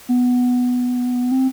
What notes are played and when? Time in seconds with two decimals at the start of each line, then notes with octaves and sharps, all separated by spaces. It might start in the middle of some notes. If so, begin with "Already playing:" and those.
0.09 B3
1.31 C4